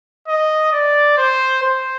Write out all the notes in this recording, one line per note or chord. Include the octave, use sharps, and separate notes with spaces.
D#5
D5
C5
C5